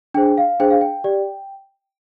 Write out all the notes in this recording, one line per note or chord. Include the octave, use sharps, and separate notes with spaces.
D4 G#4 C5 G5
F5
D4 G#4 C5 G5
F5
G5
G4 D5